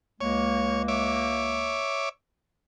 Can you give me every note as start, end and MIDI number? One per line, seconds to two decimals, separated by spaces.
0.21 1.83 37
0.21 1.83 56
0.21 1.83 58
0.21 0.82 73
0.88 2.09 73
0.88 2.09 76
0.88 2.09 86